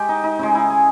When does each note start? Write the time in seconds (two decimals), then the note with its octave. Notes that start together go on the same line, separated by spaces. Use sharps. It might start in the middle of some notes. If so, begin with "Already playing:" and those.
Already playing: G#3 G4
0.09 D#4
0.24 D#4
0.39 C#3 G#3 D#4
0.55 E4
0.70 G#4